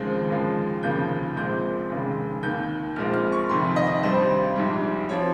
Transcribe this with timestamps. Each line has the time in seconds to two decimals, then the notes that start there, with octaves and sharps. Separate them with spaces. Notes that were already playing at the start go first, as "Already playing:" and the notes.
Already playing: D#2 C#3 F3 G#3 C4
0.30 D#2 C#3 F3 G#3
0.83 F1 D#2 C#3 F3 A#3 G6
1.36 A#1 A#2 G#3 C4 G6
1.90 F1 D#2 C#3 G#3
2.43 D#2 D#3 A#3 G6
2.96 A#1 A#2 G#3 C4 F6
3.14 F6
3.32 C#6
3.49 F1 F2 C3 D#3 C6
3.76 D#5
4.03 G#1 G2 G3 C4 C5
4.56 A#1 G#2 G3
5.09 F3 C4 C#5